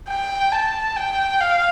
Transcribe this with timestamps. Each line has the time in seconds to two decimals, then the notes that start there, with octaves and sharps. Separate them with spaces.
0.09 G5
0.52 A5
0.97 G5
1.41 F5